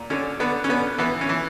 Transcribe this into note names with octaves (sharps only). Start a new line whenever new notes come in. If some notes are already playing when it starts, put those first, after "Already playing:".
Already playing: A#2
D3 C#4
D3 B3
C#4
D3 B3
E3 B3
C#4
E3